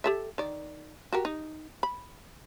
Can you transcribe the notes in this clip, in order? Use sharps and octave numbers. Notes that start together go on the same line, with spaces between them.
G4 A4 E5
D#3 D5
F#4 G4 A#4
D#4
B5